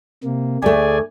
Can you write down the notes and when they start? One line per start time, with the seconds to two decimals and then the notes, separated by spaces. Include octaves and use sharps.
0.24 C3 A#3
0.62 D2 A3 G#4 D5 G#5